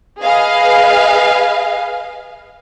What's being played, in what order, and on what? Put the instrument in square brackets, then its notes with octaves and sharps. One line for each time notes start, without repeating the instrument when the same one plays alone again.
[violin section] G#4 B4 D#5 F5